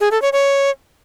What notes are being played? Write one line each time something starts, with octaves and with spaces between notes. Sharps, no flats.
G#4
A4
C#5
C#5